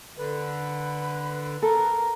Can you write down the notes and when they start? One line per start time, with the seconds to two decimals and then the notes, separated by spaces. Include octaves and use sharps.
0.17 D3 B4
1.62 A4 A#4